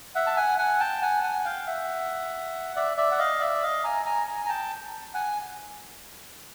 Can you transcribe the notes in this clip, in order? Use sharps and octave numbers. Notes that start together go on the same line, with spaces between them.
E5 F#5
A5
F#5 G#5
F#5 G#5
G5 A5
F#5 G#5
F#5 G#5
F#5
F5 G5
E5 F#5
D5 E5
D5 E5
F#5
D#5 F5
D5 E5
D#5 F5
G#5 A#5
G#5 A#5
G#5 A#5
A#5
G5 A5
F#5 G#5